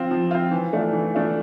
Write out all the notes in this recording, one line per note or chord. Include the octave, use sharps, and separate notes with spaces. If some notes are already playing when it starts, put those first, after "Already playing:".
Already playing: F3 C4 F4
F3
C4 F4
E3
A3 D4 F4
E3
A3 D4 F4